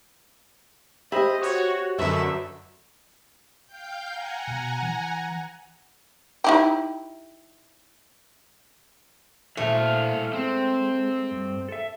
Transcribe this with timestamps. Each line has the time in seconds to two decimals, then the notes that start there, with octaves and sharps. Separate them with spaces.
1.12 G4 C5 D#5 E5 B5
1.42 F#4 C#5
1.99 F#2 D3 A3 B4 D#5 E5
3.66 F5 G5 G6
4.09 F#5 G#5 A#5
4.47 B2
4.82 E3
6.44 D#4 E4 G4
9.57 A#2 E3 A3 C5 F5
10.33 G#3 C4
11.31 G2
11.69 A4 E5